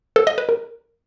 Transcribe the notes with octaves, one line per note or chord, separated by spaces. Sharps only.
A4
D#5
B4
A#4